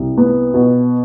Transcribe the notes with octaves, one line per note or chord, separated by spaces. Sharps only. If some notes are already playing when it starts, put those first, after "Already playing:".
Already playing: C2
B3
B2